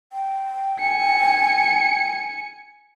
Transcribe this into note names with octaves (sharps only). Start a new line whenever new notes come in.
G5
G#5 C#7